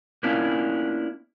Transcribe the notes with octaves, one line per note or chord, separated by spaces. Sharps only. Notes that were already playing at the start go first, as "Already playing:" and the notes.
A#3 B3 C#4 D4 E4 F4